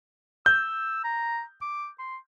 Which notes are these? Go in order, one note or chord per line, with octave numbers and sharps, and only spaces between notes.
E6 G6
A#5
D6
C6